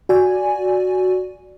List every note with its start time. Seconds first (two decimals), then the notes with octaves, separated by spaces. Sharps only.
0.09 F#4 D5 G#5